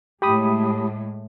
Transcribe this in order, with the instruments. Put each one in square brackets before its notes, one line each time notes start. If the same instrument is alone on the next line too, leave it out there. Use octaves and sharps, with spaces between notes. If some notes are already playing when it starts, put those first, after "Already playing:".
[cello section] A2 G#3 [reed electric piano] G4 B5 D#6